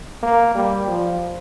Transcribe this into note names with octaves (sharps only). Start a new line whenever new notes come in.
A#3
G3
F3